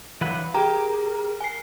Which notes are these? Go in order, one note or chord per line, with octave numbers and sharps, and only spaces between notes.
G2 E3 F#3 B4 F5 F#5
G4 G#4 A#4 A#5
G#5 C7